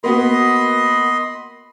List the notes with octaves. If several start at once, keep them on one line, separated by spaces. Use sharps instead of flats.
A#3 B3 F#4 D#5 B5 C6